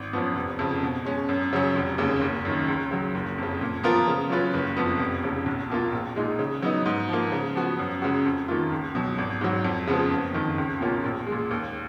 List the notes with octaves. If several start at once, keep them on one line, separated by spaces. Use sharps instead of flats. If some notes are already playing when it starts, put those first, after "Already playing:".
Already playing: G#1
F#2 F3 B3
F1
F2 C#3 F3
B2
G#3 C#4
F#2
C#3 F#3 C#4
F1
D#2 C#3 G#3 C#4
F#1
F#2 D#3
C#2
C#3 F#3
F#1
F2 C#3
A#2
F3 B3 F4 A#4
C#3
F#3 C#4 F4 B4
F#1
F2 F3 B3
F1
D#2 C#3
B1
B2 A#3 F4
A#1
A#2 G#3 D#4
C#3
F#3 B3 D#4
G#2
F3 A#3
C#3
F3 B3 F#4
F#2
C#3 G#3 C#4 F#4
F2
D#3 A#3 F4
C#2
B2 F#3
G#1
G#2 F#3
F2
C#3 F3 G#3 B3
F#1
F2 D#3
C#2
B2 A#3 C#4 F4
A#1
G#3
A#2
D#2